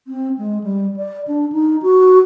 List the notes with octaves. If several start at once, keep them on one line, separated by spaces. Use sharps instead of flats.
C4
G#3
G3
D5
D4
D#4
F#4